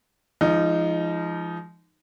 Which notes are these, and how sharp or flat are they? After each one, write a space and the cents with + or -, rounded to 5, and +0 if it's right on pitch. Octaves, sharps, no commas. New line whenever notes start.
F3 -30 G#3 +0 D#4 +0